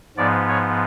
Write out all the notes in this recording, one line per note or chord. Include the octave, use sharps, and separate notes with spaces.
G#2 F3 B3 D5
C#5